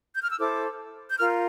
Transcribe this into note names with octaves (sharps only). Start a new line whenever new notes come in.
G6
F6
E6
E4 A4 C5 D6
G6
F4 A#4 F6